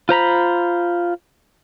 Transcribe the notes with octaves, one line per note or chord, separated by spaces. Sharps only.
F4 C5 A#5 B5